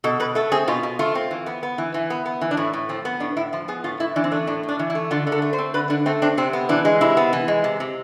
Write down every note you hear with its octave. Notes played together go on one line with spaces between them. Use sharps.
B2 A4
B2 B4
A3 A4
C4 G#4
B2 F4
B2
A3 F4
C4
E3
B3
B3
E3
E3
B3
B3
E3
D4
A2 E4
A2
F3 C4
B3
A2 D4
A2 E4
F3 F4
B3 G#4
A2 F4
A2 E4
E3 D4
C4
A3 D4
A2 D4
A2
D4
E3
E4
A3
D3 F4
D3
A4
A3
C5
C4
D3 B4
D3 D4
A3 C4
C4 D4
C3 C4
B3
E3 D4
G#3
C3 E4
B3
E3
G#3
C3
C3